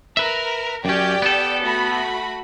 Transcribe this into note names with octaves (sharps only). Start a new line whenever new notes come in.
A#4 B4 E5
F#2 C#4 G4 D5 G5
B3 A4
A3 F#4 B5